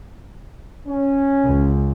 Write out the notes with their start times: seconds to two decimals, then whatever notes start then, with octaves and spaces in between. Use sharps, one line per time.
0.88 C#4
1.45 C#2